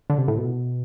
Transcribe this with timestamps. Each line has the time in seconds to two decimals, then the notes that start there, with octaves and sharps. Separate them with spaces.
0.10 D3
0.18 C3
0.28 A2
0.38 B2